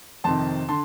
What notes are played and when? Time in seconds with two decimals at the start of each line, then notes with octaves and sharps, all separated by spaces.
0.24 F2 C3 D#3 A5 C6
0.69 D3 A5 C6